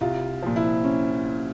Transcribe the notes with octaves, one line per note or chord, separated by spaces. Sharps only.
C2 F4
A#2 F3
E4
C#4